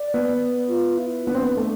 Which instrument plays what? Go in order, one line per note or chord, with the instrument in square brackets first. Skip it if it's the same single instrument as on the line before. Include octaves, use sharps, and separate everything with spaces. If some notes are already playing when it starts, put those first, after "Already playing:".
Already playing: [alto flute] D5
[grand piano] B3
[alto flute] F4
E4
[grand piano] B3 [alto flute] D4
[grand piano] C4
B3
A3